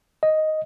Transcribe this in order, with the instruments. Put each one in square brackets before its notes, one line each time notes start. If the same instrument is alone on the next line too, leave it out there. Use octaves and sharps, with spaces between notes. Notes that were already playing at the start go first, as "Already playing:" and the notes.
[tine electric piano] D#5